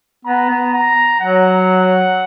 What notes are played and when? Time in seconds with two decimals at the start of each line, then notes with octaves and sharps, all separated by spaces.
0.25 B3 A#5
0.50 B3
0.74 A#5
1.20 F#3 F#5